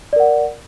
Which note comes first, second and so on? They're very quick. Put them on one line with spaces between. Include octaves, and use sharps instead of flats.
D5 A#4 F#5